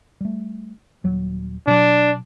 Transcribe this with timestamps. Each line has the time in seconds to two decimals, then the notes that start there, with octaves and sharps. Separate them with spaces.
0.21 G3 A3
1.04 D#1 F#3
1.67 B2 F#3 D4